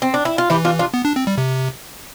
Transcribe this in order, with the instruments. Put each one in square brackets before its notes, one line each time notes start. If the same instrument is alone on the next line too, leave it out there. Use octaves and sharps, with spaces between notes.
[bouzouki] C4
D4
E4
F4
[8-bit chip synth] E3 [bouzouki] E4 G4
[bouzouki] D4 F4
D4 F4
[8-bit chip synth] B3
D4
C4
G3
C3